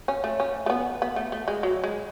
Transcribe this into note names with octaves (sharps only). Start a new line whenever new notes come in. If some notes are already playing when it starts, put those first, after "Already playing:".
C#4
A3
C#4
A3
B3
B3
A3
A3
G#3
F#3
G#3